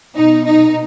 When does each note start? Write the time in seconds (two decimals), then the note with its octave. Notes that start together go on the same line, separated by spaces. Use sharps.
0.16 B2 D#4
0.46 D#4